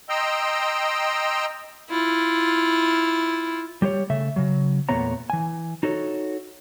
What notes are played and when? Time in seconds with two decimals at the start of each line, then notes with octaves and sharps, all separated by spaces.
0.09 D#5 G5 A#5 C6 E6
1.90 E4 F4
3.82 G3 G4 C5 C#5
4.10 C#3 A3 E5
4.36 C#3 F#3
4.89 E2 A#2 A3 B3 C#5 A#5
5.30 E3 G#5
5.83 D#4 F#4 A4 C#5